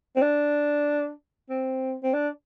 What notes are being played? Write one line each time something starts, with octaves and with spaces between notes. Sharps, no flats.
C4
D4
C4
C4
D4